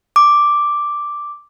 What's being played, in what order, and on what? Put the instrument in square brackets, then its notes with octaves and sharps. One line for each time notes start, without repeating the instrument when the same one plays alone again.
[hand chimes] D6